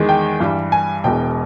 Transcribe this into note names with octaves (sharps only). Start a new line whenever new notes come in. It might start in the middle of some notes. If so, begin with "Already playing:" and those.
Already playing: E2 D#3 G#3
G5
G2 E3 G3
G#5
E1 E2 B2 G#3 G5